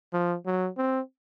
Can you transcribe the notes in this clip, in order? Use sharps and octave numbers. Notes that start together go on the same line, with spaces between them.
F3
F#3
C4